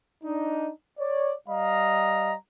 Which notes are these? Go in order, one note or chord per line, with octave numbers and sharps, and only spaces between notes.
D4 D#4
C#5 D5
G3 D#5 F5 A#5